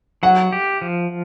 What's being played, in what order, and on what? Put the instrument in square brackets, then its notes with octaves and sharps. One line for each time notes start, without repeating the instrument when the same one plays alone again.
[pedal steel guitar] F#3 [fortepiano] F#5
[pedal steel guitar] G4
F3